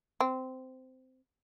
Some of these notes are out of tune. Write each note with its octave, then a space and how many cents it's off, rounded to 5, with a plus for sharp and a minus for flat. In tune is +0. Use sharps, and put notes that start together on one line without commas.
C4 -15